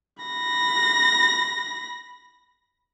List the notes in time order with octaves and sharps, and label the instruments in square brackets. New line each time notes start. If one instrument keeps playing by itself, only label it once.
[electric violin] B5 A#6